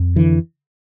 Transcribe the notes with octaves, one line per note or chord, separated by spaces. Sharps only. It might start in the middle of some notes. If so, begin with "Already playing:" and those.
Already playing: F2
D3 E3